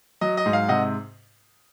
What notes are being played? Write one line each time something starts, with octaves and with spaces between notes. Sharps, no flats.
F#3 D#5
D#5
G#2
F5
C3 D#5 F#5